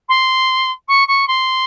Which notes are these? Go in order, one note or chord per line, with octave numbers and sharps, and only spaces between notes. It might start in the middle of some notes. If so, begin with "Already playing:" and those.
C6
C#6
C#6
C6